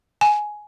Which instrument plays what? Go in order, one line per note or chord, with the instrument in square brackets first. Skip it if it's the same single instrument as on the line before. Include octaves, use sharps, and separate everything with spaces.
[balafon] G#5